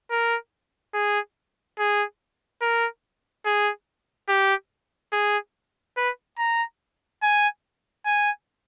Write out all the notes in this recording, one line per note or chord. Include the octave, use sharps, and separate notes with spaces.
A#4
G#4
G#4
A#4
G#4
G4
G#4
B4
A#5
G#5
G#5